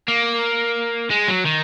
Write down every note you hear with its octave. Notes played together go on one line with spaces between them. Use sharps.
A#3
G#3
F#3
D#3